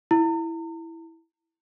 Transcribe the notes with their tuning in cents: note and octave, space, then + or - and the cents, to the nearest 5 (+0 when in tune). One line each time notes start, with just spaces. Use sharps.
E4 +0 A#5 -40